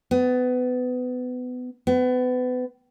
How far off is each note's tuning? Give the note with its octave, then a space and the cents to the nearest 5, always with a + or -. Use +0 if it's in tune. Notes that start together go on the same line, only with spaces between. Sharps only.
B3 +25
B3 +30